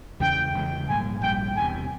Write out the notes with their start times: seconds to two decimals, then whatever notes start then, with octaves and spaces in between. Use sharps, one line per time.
0.20 E2 C#3 E3 G#3 G5
0.54 E2 C#3 E3 G#3
0.88 A#1 G#2 G3 A#3 G#5
1.22 A#1 G#2 G3 A#3 G5
1.56 E1 E2 C3 G#5